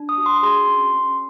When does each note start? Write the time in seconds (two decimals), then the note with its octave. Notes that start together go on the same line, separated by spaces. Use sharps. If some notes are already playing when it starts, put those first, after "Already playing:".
Already playing: D4
0.09 D#6
0.18 F#4
0.26 C6
0.43 G#4 C6
0.68 C#4
0.94 C#4